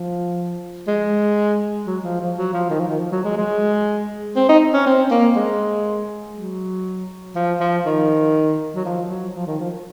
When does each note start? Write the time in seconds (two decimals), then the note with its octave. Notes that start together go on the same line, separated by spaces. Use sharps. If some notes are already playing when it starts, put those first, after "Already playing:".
Already playing: F3
0.88 G#3
1.87 F#3
2.04 F3
2.20 F3
2.37 F#3
2.53 F3
2.70 D#3
2.80 F3
2.87 D#3
2.99 F3
3.12 F#3
3.24 G#3
3.37 G#3
4.36 C4
4.49 D#4
4.74 C#4
4.87 C4
5.11 A#3
5.36 G#3
6.36 F#3
7.35 F3
7.60 F3
7.86 D#3
8.75 F#3
8.85 F3
9.10 F#3
9.35 F3
9.47 D#3
9.60 F3